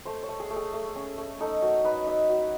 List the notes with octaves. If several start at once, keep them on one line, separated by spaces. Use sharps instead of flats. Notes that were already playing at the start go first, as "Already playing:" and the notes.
A3 C5
C#5
A3
G#4
A3
G#4
A3
C#4
A3
D#4 A4
F#3 A#4
D#4 B4
D#4 E5
F#3